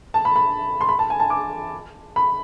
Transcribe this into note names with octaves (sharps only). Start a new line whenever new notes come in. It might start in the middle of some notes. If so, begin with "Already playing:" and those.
A5
B5
B5
C6
B5
A5
G#5
A5
D6
B5